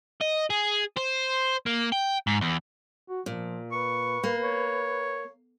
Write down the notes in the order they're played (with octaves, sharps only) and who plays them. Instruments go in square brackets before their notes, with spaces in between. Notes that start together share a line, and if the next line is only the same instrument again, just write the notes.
[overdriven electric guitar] D#5
G#4
C5
A#3
G5
G#2
E2
[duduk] F#4
[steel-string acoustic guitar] A#2 [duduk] F3
[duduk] B4 [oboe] C#6
[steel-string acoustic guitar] A#3
[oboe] C#5